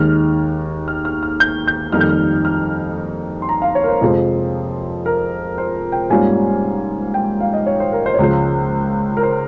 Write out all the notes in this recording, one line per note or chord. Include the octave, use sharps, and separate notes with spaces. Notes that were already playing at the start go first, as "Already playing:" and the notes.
Already playing: D#2 D#3 G#3 D#4 F6
F6
F6
F6
G6
G6
F2 D#3 G3 A#3 D#4 F6
G6
F6
F6
C6
A#5
F5
C#5
A#4
C5
F2 C3 F3 G#3 C4
A#4
C5
G5
G#2 G3 A#3 C#4 F4 G#5
G5
F5
D#5
C#5
C5
A#4
C5
C#5
C#2 C#3 F3 G#3 C5
A#4
C5